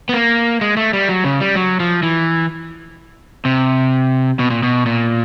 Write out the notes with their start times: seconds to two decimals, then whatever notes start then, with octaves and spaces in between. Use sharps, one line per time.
0.09 B3
0.14 A#3
0.61 G#3
0.77 A3
0.93 G3
1.09 F#3
1.24 C#3
1.40 G3
1.55 F#3
1.80 F3
2.03 E3
3.45 C3
4.39 B2
4.50 A#2
4.63 B2
4.86 A#2